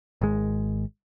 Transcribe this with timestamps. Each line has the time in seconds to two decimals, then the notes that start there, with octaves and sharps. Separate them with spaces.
0.21 G#1 G#3